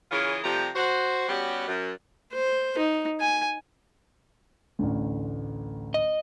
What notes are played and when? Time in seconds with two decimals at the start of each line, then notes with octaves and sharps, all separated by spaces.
0.11 C#3 E3 F4 G#4 A#4 C#5
0.43 C3 F3 G3 A3 G4 A#5
0.75 F#4 C5
1.28 G3 B3 C#4 F#4 G4
1.67 F#2
2.33 C5
2.78 D#4
3.20 G#5
4.79 A1 D2
5.94 D#5